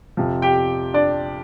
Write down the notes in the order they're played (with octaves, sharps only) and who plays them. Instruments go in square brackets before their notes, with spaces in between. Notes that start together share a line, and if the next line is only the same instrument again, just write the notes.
[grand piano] F2 C3 F3
G4 G5
D4 D5